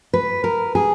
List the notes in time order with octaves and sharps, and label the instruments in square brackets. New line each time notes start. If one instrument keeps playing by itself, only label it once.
[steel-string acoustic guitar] B4
A#4
G#4